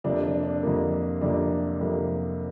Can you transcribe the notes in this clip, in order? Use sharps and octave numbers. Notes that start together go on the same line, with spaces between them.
F2 C3 A#3 D4
D4
D4
F2 C3 A#3
F2 C3 A#3 D4
F2 C3 A#3